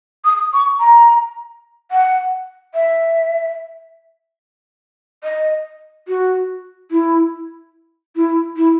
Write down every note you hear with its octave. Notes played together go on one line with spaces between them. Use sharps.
D#6
C#6
A#5
F#5
E5
D#5
F#4
E4
E4
E4